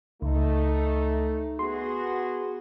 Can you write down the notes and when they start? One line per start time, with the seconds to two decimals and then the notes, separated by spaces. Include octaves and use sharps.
0.22 C#2 A3 D#4
1.59 B3 F#4 G#4 C6